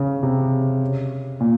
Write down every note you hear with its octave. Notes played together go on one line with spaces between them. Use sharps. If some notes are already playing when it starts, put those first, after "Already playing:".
Already playing: C#3
C3
A#2